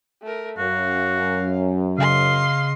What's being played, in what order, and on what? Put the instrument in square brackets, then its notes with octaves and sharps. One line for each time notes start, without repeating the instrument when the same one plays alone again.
[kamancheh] A3 A#4
[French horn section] F#2 [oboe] F#4 [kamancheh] F5
[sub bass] C#3 [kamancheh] D#5 C6 [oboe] F5